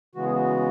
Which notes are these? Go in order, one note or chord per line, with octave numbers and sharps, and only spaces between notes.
C#3 E3 G#3 B3 F#4
G#4
F#4